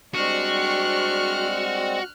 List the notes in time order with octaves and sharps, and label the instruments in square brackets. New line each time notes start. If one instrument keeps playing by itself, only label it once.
[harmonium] G3 G#3 C4 [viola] D4 C#6 [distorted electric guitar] F#4 [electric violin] F6 F#6